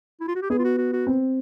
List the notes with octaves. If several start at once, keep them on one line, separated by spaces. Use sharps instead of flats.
E4
F4
F#4
G4
B3 G#4
F4
F#4
F#4
F#4
C4